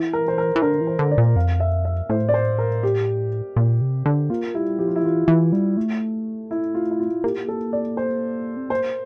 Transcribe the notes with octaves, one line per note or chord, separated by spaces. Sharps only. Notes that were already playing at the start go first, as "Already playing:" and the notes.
Already playing: E3
A#4
C5
A#4
E3
D3 A#4
E3
C5
D3
D5
A#2
F2 F5
E5
E5
A2 C5
D5
C5
A#4
G4
A#2
C3
D3
A#3 F4
G3 E4
F3 G4
F4
E4
E3 F4
E3
G3
A3
E4
F4
E4
F4
A#3 G4
A4
D5
C5
C4
A#3 C5